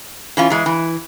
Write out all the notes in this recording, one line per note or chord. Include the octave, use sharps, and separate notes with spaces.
E3 C#4 F4
E3 G#3
E3